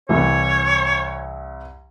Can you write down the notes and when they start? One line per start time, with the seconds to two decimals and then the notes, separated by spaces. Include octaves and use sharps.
0.09 C2 E3 C#5